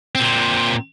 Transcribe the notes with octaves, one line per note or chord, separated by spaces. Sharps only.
A#2 C4